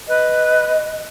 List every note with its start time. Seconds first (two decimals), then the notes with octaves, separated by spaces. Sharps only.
0.08 B4 D#5